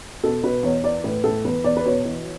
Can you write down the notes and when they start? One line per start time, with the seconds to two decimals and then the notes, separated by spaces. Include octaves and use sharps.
0.24 B2 A4
0.43 B2 B4
0.63 E2 C#5
0.84 E3 D5
1.04 A2 B4
1.24 A2 A4
1.44 E2 B4
1.64 E2 D5
1.77 B4
1.85 B2 C#5
2.05 E3